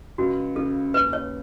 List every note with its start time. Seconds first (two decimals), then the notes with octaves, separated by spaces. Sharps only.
0.18 C#2 F#4
0.56 C#3 A4
0.94 D#2 B4
1.13 C#5